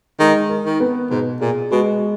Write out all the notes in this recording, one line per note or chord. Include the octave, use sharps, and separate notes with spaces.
D#3 G#3
A#4
D#3
B3
G#2 B2
A#2 G#4
B2 G#3